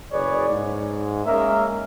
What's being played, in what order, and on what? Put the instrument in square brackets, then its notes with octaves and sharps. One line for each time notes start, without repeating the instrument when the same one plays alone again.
[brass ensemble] F#1 G#4 B4 C#5 D5
G#2
G#3 A#3 C#4 A#4 D#5 E5